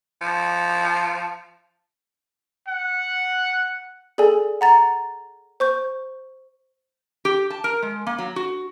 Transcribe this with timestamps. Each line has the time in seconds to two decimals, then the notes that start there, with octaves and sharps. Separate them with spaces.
0.21 F3
2.68 F#5
4.18 G#4 A4 D5 G#5
4.61 F#5 A#5 A6
5.60 C5 C#6 G6
7.25 G4
7.50 A5
7.64 A#4
7.83 G#3
8.07 A#3
8.18 F#3
8.36 F#4